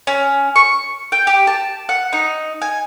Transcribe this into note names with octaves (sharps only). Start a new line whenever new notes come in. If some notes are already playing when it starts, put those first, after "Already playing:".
C#4
C#6
G5
G4
A5
F#5
D#4
G#5